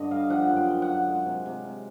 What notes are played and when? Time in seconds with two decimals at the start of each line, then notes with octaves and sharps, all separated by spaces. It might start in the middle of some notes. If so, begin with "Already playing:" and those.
Already playing: G2 D3 D#5
0.11 G3 F5
0.30 F3 F#5
0.50 F#2
0.56 G5
0.68 F#2
0.82 F#5
0.88 F#2
1.07 G#3
1.26 C3
1.46 C3
1.64 C3